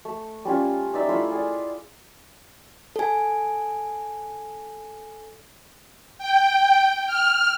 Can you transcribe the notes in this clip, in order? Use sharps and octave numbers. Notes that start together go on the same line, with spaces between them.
A3
G3 C#4 F4 C#5
D#4 D5 E5
A3 E4 F4 C#5
G#4 D5
A4 G#5
G5
F6